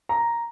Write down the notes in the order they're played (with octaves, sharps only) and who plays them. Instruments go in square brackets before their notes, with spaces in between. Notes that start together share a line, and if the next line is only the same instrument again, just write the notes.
[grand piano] A#5